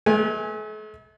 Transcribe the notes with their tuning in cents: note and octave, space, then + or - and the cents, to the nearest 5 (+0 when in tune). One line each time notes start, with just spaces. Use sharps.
A3 -45 B4 -35 G#5 +0